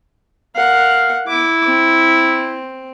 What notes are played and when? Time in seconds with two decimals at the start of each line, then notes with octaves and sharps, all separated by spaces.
0.55 A#4 F5 F#5
1.27 E4 D6
1.67 C4